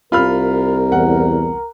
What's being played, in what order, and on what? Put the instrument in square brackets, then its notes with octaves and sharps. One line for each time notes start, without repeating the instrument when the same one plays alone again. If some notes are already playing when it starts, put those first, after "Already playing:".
[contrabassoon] C2 [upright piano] F4 B5 F6 [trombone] A#4
[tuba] E2 [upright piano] F#5